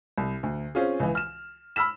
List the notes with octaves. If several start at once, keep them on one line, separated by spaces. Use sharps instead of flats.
C2
D2
C4 C#4 F4 G#4
C#2 E3
F6 E7
B5 E6 F6 B6 E7